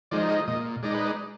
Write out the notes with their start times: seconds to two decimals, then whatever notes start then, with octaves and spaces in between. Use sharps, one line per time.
0.11 F3 G#3 D#4 D5
0.29 D#5
0.48 A#2 D#5
0.83 G#3 D#4 D5
0.94 B4
1.05 D5